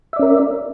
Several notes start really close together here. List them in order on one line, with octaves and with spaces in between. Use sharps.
E5 D5 C#4 A#4